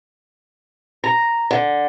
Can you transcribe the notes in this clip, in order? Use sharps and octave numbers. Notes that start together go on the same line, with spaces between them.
A#5
D3